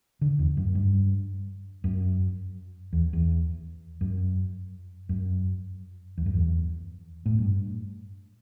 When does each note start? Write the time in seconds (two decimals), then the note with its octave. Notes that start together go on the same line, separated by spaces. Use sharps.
0.21 D3
0.39 E2
0.57 F#2
0.75 G2
1.84 F#2
2.93 E2
3.13 E2
4.01 F#2
5.09 F#2
6.18 E2
6.26 F#2
6.34 E2
7.26 A2
7.39 G2